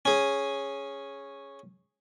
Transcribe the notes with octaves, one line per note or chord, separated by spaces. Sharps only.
C#4 G#4